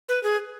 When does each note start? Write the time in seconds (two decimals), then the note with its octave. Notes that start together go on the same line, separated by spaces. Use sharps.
0.09 B4
0.23 G#4